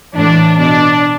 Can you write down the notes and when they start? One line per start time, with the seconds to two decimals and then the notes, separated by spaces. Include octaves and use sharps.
0.15 A2 E3 D4
0.58 B2 D4